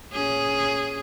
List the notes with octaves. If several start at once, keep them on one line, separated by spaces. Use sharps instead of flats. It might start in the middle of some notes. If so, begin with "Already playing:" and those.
A#2 C#4 G#4